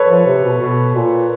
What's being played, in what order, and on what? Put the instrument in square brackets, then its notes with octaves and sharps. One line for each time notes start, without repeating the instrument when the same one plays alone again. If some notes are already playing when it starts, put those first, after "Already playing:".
Already playing: [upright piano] A4 B4 C#5
[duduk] F3
C3
B2
B2
A#2